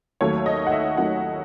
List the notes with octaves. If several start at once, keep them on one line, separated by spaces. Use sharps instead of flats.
D#2 D#3 F#3 A3 C#5
D#5
F#5
E5
D#2 D#3 F#3 A3 F#5